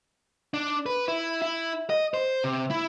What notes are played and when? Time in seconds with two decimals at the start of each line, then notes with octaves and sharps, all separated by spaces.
0.54 D4
0.86 B4
1.08 E4
1.42 E4
1.90 D#5
2.14 C5
2.44 C3
2.70 E4